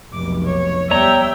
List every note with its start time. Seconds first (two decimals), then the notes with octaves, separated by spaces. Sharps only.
0.14 F1 B1 D6
0.45 C#5
0.91 D#2 G3 B3 C#5 D5 E5 G5 A#5